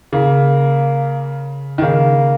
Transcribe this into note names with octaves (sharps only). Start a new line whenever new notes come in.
C#3 A#3
D#3
C#3 A#3